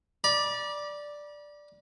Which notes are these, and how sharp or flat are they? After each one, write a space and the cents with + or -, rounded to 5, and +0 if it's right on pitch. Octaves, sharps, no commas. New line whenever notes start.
D5 +0 B5 -40